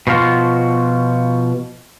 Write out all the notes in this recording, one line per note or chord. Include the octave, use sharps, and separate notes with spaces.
B2 F3 G#3 F4 F#4